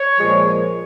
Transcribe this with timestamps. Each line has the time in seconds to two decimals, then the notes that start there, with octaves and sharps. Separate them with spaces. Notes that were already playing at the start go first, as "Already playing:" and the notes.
Already playing: C#5
0.18 A#2 F3 G#3